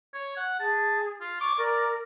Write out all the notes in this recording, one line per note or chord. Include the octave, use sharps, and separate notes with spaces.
C#5
F#5
G#4 A5
F4
C#6 D6
A#4 D5